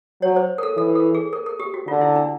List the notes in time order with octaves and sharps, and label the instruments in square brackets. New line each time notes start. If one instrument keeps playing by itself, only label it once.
[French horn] F#3 [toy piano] C#5
[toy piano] C5
A#4
A4
[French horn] E3 [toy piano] A4
[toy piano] A4
G#4
A#4
A#4
G4
F#4
[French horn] D3 [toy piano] F4
[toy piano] E4
D4